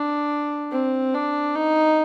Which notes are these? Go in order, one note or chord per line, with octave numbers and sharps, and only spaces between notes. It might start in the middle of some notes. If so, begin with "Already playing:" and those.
Already playing: D4
C4
D4
D#4